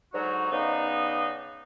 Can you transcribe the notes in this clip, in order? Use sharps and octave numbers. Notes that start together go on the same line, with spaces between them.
G#2 D3 F#3 D#4 F#4
C#3 B3 D4 D#4